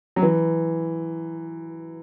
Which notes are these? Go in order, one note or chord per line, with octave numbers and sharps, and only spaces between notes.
F#3
E3